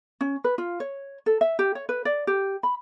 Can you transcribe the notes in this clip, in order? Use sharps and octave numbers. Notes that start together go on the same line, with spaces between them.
C#4
B4
F4
C#5
A4
E5
G4
C#5
B4
D5
G4
B5